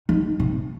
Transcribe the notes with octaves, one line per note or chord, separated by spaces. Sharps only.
D#3
C3